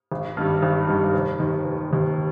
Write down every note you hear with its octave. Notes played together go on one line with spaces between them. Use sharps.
G#1
G2 D#3 G3
G#1
G2 D#3 G3
F1
D#2 D#3
F1
D#2 D#3